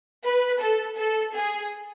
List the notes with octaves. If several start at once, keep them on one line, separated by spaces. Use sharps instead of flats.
B4
A4
A4
G#4